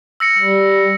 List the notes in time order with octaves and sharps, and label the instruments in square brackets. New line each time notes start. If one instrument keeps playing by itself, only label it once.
[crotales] E6 A#6 C#7
[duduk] G3